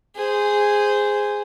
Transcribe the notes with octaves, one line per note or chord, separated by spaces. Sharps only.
G#4 C5